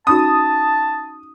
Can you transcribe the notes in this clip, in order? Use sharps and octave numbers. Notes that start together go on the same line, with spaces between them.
C#4 D#4 F#4 A5 D#6